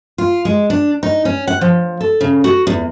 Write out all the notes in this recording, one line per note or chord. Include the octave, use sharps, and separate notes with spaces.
F4
G#3
D4
D#4
C#4
F#5
F3
A4
C#3
F#4
E2